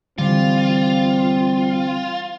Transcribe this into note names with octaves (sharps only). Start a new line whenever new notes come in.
D3 E3 G3 C4 F4